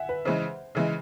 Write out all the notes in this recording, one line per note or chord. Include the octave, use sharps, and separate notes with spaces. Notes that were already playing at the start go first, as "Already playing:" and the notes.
Already playing: E5 F#5 G#5
B4
C#3 E3 G#3 C5
C#3 E3 G#3